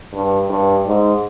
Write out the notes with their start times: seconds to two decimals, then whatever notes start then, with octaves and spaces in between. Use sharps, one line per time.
0.13 G2
0.50 G2
0.86 G#2